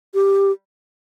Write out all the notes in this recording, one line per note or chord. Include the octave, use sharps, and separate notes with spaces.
G4